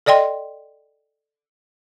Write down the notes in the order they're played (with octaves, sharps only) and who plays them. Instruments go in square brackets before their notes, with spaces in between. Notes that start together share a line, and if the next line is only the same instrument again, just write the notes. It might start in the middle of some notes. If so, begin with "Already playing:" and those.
[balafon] A4 D5 D#5 G5 C6